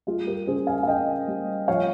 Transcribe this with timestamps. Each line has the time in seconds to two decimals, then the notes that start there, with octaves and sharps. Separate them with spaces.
0.07 G3 F4 G#4
0.27 G4 A#4
0.47 C#3 G#4 C5
0.67 F5 G#5
0.83 F5
0.87 C#3 D#5 G5
1.28 G3
1.68 F3 C#5 F5